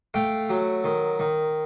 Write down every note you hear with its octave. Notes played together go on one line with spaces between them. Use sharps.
A3 F5 G5
F#3
D#3
D#3